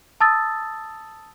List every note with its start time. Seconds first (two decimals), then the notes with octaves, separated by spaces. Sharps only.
0.21 A5 D#6 E6 A6